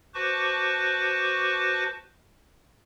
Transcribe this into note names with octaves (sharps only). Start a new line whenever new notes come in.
F#4 B4 C5 A5 C#6 D6